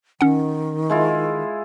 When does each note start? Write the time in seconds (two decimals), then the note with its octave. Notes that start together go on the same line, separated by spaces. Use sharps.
0.21 D#3 C#4 F#5
0.90 G#3 E4 F4